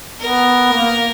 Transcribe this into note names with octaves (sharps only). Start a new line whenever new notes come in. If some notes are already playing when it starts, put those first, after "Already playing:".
B3 A#4
A#3